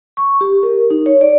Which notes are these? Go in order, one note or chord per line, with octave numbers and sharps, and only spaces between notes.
C#6
G4
A#4
D#4
C#5
D5